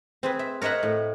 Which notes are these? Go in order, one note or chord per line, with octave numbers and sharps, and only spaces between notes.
C4 G#4 B4
E5
A#4 C#5 D#5 E5 F#5
A2